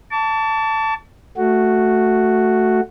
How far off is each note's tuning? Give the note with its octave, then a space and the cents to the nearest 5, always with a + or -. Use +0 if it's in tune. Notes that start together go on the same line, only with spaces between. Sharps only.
A5 +10 D6 -45
A3 +0 F#4 +0